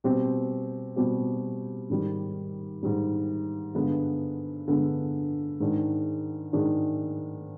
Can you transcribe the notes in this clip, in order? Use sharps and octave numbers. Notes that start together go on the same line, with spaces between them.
B2 G3 C4 G4
B2 G3 C4 G4
G#2 D#3 G3
G#2 D#3 G3
G2 D3 G#3 B3
G2 D3 G#3 B3
G#2 D#3 G#3 D4
G#2 D#3 G#3 D4